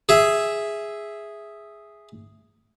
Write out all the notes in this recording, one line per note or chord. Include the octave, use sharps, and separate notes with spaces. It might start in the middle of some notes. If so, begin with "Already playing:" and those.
G#4 E5